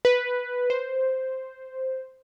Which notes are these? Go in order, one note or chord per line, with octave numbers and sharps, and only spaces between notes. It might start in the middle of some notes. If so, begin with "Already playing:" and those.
B4
C5